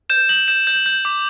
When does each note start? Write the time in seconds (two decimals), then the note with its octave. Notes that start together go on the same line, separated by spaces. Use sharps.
0.10 G6 E7
0.29 G6 F#7
0.48 G6 E7
0.67 G6
0.86 G6
1.05 D6